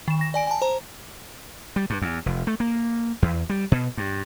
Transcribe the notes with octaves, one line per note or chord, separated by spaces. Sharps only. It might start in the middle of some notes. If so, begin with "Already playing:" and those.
D#3 E7
A#6
D5 G#5 D7
G#5 A5
C5 A#5
G3
G2
E2
F1
A3
A#3
E2
G3
B2
G2